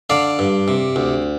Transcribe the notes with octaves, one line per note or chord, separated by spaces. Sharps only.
D3 D5 F5
G2
C3
D2